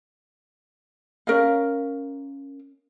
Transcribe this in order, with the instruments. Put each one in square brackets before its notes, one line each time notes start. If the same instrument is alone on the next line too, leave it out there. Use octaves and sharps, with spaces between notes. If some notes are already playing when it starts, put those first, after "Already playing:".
[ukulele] C#4 A#4 D#5 F5